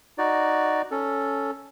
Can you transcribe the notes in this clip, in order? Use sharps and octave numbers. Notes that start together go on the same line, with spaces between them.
D#4 F#4 D5
C#4 A4